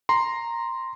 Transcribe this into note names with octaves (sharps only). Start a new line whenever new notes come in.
A#5 C6